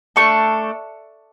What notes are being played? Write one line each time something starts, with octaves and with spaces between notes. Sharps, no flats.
A3 D4 A4 C#6